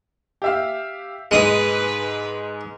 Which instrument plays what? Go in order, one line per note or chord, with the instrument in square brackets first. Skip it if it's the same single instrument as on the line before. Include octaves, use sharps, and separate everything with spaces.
[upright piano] G4 E5 F5
[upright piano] G#2 D#4 D#5 [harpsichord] G#3 D#6 [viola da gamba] B4